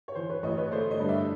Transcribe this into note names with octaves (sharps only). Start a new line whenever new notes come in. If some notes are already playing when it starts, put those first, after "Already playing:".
C#5
E3 C5
B4 C#5
A1 C#5 D#5
B4 C#5
A3 C5 D5
C#5 D#5
G2
D5 E5